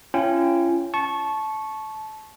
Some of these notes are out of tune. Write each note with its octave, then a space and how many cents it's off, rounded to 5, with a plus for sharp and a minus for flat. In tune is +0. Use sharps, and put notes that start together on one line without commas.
C#4 +0 F4 -40 G5 +0
A5 -20 C#6 -10